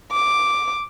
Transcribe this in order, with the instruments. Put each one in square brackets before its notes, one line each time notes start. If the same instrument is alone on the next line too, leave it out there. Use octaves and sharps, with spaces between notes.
[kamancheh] D6